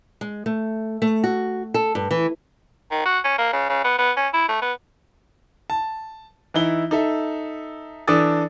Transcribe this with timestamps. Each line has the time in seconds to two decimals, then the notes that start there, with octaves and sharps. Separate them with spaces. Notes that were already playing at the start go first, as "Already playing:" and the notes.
0.21 G#3
0.46 A3
1.02 A3
1.24 F#4
1.74 A4
1.95 G2
2.11 E3
2.91 D#3
3.06 F#4
3.24 C#4
3.38 A#3
3.53 C#3
3.69 C#3
3.84 B3
3.99 B3
4.17 C#4
4.34 E4
4.49 A3
4.62 B3
5.70 A5
6.54 E3 D#4 E4 G7
6.91 D#4 A4 E5
8.07 E3 D4 A4 D6 D#6 A6